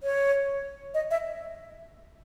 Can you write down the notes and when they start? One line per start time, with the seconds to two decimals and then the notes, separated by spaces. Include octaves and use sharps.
0.03 C#5
0.94 D#5
1.11 E5